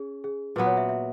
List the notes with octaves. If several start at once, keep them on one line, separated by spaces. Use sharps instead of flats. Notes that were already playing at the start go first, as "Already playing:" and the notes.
Already playing: C#4 G#4
G#4
A#2 F#3 B3 B4
C#5
E5
E5